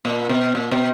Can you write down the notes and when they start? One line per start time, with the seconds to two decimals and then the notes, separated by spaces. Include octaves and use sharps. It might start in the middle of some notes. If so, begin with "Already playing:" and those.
0.05 A#2
0.29 B2
0.55 A#2
0.71 B2